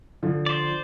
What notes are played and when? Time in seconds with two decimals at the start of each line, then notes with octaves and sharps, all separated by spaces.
0.23 D3 F3
0.46 C5 D5